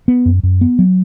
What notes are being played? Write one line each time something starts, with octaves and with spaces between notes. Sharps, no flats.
B3
F#2
F#2
B3
F#3